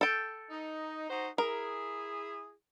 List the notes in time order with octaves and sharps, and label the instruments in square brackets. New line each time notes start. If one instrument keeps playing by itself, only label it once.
[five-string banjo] A4 G5
[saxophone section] D#4
D#4 F#4 C5
[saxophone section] E4 G#4 [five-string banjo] A#4